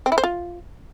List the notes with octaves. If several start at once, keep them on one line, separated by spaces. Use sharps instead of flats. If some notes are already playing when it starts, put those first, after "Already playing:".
C4
E4
C5
F4